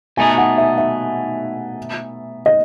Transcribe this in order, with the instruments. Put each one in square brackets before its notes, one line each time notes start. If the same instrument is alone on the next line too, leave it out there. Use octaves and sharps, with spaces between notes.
[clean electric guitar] B2 A3 D#4 G#4 [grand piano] G#5
[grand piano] F#5
E5
E5
D#5